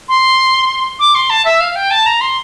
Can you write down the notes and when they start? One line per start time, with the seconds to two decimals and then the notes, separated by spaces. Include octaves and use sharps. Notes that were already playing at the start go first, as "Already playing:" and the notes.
0.09 C6
0.99 D6
1.15 C6
1.30 A5
1.45 E5
1.60 F5
1.76 G5
1.91 A5
2.06 A#5
2.21 C6